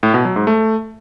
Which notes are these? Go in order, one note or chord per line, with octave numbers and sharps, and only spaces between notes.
A2
B2
F#3
G#2
A3